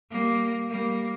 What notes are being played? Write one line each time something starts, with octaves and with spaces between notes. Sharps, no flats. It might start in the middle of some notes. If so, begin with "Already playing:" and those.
G3 A#3
G3 A#3